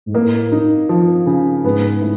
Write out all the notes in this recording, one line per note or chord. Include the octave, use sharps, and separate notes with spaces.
G#2
A2 A#3
D#4
F3
C#3
G#2 B3
A2